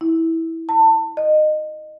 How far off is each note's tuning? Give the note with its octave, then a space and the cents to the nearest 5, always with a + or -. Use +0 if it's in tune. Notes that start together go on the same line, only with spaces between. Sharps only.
E4 -15
A5 +25
D#5 -20